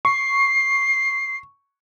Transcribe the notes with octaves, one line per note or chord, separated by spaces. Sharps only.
C#6 C7